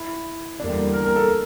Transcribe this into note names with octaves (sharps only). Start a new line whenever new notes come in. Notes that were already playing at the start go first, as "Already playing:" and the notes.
Already playing: E4
E2 D3 G3 A#3 D4
A#4
A#4
A4